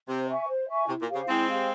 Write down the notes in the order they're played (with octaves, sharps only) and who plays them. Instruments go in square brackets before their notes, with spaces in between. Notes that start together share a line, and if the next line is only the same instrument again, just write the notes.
[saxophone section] C3 [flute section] C5
[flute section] E5 G#5 C#6
C5
E5 G#5 C#6
[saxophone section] C3 [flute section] E4
[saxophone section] A#2
[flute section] G4 C5 F5
[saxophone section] C#3
[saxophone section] G#3 C4 [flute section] E4
[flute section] G4 C5 F5